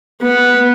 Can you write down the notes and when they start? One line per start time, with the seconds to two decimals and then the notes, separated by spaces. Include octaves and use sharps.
0.22 B3